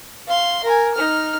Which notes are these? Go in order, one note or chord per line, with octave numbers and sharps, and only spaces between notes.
F5 C6
A#4 G#5
D#4 F6